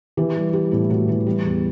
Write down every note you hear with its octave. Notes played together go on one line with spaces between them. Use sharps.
E3 G4
G3
G3 G4
A2 E4
A2 F#4
E3 E4
G3
E2